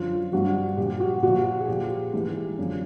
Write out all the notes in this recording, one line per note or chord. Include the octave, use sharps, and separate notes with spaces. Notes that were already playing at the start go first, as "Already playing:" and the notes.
Already playing: F#2 D3 F3 F4
G2 D3 F3 F#4
A#2 F3 G4
F#4
A#2 F3 F#4
G#4
A#2 F3 G4
G#2 E3 G4
F#2 D3 F3